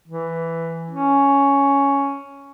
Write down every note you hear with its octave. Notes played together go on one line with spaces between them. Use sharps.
E3
C#4